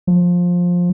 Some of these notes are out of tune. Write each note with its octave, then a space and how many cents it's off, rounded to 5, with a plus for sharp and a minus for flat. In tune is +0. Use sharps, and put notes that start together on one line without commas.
F3 +15